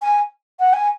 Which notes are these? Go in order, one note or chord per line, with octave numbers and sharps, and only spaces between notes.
G#5
F#5
G#5